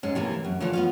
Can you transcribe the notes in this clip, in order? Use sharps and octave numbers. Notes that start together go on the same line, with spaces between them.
G#2 G#3 C#4
C3 E3 A3 A#3
F#2
D3 E3 A3 F4 C#5
B3 F4 F5